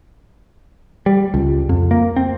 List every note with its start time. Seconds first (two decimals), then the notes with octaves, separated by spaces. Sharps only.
1.06 G3
1.34 C#2
1.69 F2
1.91 A#3
2.16 C4